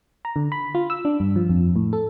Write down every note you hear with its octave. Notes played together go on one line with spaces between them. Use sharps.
A#5
D3
B5
F4
E6
D4
G2
F3
F2
A2
A4